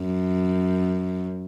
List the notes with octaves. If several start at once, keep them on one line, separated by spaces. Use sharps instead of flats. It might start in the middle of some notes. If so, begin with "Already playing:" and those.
Already playing: F#2